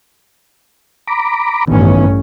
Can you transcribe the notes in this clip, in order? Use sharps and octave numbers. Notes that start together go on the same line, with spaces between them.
A#5 B5 D6
A1 G2 D#3 B3 C#4